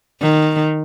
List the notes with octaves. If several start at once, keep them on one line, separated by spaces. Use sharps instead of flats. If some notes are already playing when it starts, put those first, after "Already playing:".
D#3